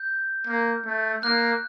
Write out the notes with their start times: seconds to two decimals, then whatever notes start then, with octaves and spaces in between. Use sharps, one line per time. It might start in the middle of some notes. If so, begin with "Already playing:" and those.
Already playing: G6
0.47 A#3
0.86 A3
1.23 A#3 F#6